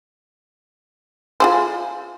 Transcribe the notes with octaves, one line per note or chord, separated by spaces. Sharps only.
F4 G#4 C5